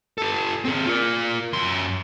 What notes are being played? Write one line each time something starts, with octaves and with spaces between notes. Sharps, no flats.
G4 A4
C4 G#4
F4 A#4
F#2 C6